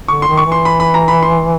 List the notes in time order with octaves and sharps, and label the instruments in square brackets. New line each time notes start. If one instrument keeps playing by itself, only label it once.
[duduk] D3 [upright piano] C#6
[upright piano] C6
[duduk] D#3
[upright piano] C#6
[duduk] E3
[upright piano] C6
B5
B5
A#5
B5
C6